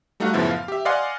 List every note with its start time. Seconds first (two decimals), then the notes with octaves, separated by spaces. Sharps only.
0.20 G3 A3 D#4 F#4 F5 F#5
0.33 F#2 A2 C#3 F3 B3 E4
0.51 F5
0.68 G4 E5
0.85 D5 D#5 F5 F#5 G#5 C6